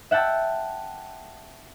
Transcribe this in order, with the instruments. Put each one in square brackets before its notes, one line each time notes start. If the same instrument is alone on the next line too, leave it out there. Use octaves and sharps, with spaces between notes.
[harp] E5 F#5 G5 A5 E6